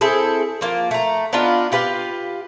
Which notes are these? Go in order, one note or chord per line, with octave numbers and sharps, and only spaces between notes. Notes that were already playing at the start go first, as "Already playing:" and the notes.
C4 E4 G#4 A4
F3 A#3 F4
A3 A#5
B3 D4 D#4 F4
F4 G4 B4 F5